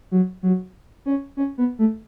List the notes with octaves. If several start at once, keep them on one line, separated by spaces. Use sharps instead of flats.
F#3
F#3
C#4
C#4
B3
A3